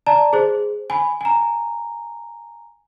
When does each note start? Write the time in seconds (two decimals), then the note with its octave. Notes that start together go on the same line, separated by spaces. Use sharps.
0.06 D5 A5 A#5
0.33 G#4 C5
0.90 G#5 B5
1.21 G#5 A#5